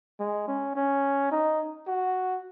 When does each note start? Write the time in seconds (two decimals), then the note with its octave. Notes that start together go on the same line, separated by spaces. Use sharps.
0.20 G#3
0.48 C#4
0.76 C#4
1.32 D#4
1.87 F#4